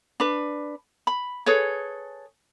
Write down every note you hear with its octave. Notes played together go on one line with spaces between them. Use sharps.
D4 B4
B5
G#4 A4 B4 C#5